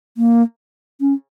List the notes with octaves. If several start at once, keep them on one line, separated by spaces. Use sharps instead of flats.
A#3
C#4